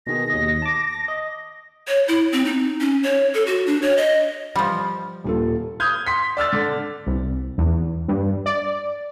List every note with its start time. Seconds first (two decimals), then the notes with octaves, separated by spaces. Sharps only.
0.07 B2 D#3 G#4 A#6
0.30 D#2 D#5
0.62 A5 D6
1.08 D#5
1.88 C#5
2.08 E4
2.32 C4
2.45 D#4
2.81 C#4
3.03 C#5
3.34 A4
3.47 F#4
3.66 D4
3.82 C#5
3.97 D#5
4.56 F3 G3
5.24 D#1 F4 A4
5.80 D#6 F6 G6 G#6
6.06 C6 B6
6.37 D5 E6 F6 A6
6.53 D3
7.06 C2
7.58 E2
8.08 G2
8.46 D5